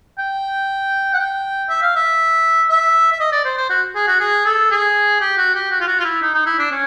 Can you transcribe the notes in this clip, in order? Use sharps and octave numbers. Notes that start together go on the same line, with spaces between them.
G5
F#5
G5
E5
F5
E5
E5
E5
D#5
D5
C5
C5
F#4
G#4
F#4
G#4
A4
G#4
G4
F#4
G4
F#4
F4
F#4
F4
E4
D#4
D#4
E4
D4
C#4